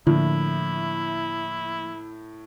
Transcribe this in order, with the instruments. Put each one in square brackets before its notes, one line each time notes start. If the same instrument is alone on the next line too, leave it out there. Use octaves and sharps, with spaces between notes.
[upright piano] A2 [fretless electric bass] D3 [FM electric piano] F3 A#3 [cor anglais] E4